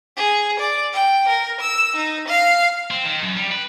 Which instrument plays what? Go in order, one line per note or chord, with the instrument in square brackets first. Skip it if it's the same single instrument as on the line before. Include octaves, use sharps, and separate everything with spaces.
[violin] G#4
D5
G5
A#4
E6
D#4
F5
[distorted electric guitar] C4
D#3
F#2
G3
B4